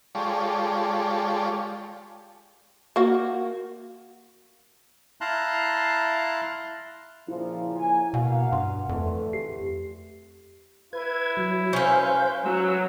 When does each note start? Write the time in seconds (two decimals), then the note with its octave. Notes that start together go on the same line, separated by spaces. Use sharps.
0.15 G#3 F4 G4 A4 C#5 D5
2.96 A#3 F#4
5.21 E4 F5 A5 A#5 C6 F#6
7.28 A#2 C#3 F3 E4
7.77 A#3 C#5 G#5
8.14 B2 A#3 F5 F#5
8.52 G2 C6
8.89 F2 D3 E3 A3
9.33 G4 C7
10.93 E4 B4 G#6
11.37 F#3
11.73 C#4 B4 C5 F5 G6
12.46 F#3 F#5 E6